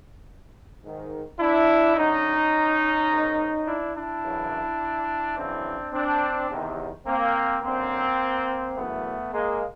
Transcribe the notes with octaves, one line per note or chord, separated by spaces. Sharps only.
G#2 D#3
D4 E4
F#2 D3 C#4 D#4
G#2 D#3
D4 E4
D4 E4
F#2 C#3 E3
F#2 C#3 E3 C4 D4
C4 D4
E2 C3 D#3
A#3 C4
F#2 D3 A#3 C4
F#2 C#3 E3 A3 B3
G#3 A#3